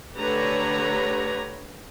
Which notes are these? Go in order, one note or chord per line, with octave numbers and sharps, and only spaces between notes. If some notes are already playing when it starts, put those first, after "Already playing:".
D3 A3 G4 B4 C#5 A#5